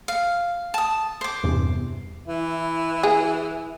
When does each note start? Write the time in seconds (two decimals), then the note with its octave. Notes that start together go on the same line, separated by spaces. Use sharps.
0.08 F5
0.74 A5 D#6
1.21 C5 D6
1.44 E2 G2 C3
2.28 E3 E4
3.03 G#4